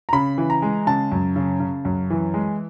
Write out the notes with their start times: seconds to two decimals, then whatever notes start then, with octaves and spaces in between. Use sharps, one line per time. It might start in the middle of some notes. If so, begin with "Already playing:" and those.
0.09 A#5
0.13 C#3 B5
0.38 E3
0.50 A#5
0.62 G#3
0.87 C#3 A5
1.12 F#2
1.36 C#3
1.60 C#3
1.85 F#2
2.10 E3
2.34 G#3